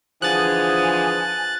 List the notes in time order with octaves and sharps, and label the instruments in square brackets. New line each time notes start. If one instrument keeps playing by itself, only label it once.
[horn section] D3 E3 G#4 [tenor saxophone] F3 [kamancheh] G#5 [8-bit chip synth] F#6 A6